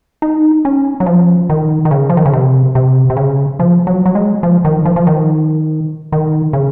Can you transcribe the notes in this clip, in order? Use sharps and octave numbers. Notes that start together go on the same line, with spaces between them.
D#4
C#4
F#3
F3
D#3
D#3
C#3
F3
D#3
C#3
C3
C3
C3
C#3
F3
F#3
F#3
G#3
F3
D#3
F3
F3
D#3
D#3
C#3